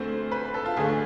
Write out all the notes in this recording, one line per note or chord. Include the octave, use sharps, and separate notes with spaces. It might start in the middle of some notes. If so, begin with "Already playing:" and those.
Already playing: D2 D3 A3 C4 C5
B4
A4
F4
D2 D3 A3 G#4